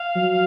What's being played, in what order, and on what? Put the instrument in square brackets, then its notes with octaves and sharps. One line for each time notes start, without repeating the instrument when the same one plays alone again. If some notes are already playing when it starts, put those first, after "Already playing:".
Already playing: [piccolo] F5
[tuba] F#3